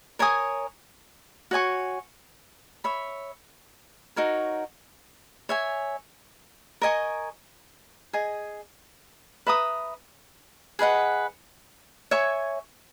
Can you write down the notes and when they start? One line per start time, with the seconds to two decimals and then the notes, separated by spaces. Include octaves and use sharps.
0.19 A#4 C#5 G#5 D#6
1.51 F#4 C#5 G#5 C#6
2.84 C#5 E5 B5
4.16 D#4 F#4 A#4 C#5
5.49 C#5 E5 G#5
6.82 A#4 D#5 G#5 C#6
8.13 G#4 D#5 G#5
9.47 B4 E5 A#5 D#6
10.79 G#4 B4 D#5 F#5
12.11 C#5 E5 G#5 C#6